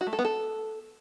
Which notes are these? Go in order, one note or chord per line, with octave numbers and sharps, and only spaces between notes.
F#4
A3
A4
B3
A4